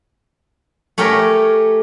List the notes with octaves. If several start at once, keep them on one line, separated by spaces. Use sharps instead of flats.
A3 C#4 G4 A#4 C#5